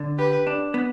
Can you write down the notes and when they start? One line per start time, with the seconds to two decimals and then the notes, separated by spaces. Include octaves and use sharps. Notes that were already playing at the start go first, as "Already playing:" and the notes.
Already playing: D3
0.19 G4 B4
0.47 D4
0.74 B3